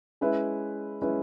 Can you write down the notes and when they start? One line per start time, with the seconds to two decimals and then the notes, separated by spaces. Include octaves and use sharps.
0.21 G#3 C#4 E4 B4 E5
1.02 G#3 C#4 E4 B4 E5